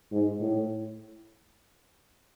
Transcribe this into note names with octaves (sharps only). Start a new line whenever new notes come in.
G#2
A2